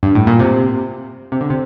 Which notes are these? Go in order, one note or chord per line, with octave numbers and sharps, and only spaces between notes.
G2
A2
A#2
C3
C3
D3
C3